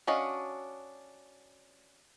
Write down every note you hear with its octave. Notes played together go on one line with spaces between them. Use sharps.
C#4 D4 F#4 D#5 F5